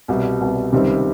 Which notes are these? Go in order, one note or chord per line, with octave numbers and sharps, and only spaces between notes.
C2 B2 G3
C2 B2 G3
C#2 C3 D#3 G3 C4